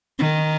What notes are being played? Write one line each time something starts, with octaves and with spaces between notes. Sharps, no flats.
D#3